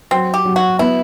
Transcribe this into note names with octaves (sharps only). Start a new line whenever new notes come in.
F#3 C4
G4
F#3
F#4
B3 E4